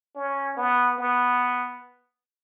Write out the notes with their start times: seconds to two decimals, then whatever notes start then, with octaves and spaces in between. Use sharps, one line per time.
0.15 C#4
0.57 B3
0.99 B3